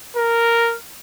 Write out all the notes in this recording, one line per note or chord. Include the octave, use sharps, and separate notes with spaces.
A#4